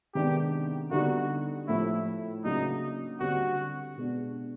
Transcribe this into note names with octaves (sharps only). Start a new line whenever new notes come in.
C3 D#3 G#3 B3 D4 G4
D3 G3 B3 D#4 F#4
A2 F3 A3 E4
C#3 F#3 A#3 D4 D#4
D3 G3 C4 F#4
B2 G#3 B3 D4